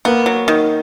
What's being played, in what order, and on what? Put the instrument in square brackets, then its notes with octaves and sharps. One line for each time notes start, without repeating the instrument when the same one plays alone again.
[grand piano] A#3 [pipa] B3
[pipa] F#3
D#3